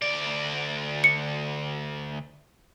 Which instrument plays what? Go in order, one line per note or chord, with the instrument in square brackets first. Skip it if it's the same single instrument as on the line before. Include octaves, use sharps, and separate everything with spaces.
[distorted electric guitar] D2 D5
[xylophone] C#7